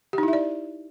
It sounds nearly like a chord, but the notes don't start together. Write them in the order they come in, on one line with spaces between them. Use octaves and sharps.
G4 D#4 E4 E5 D5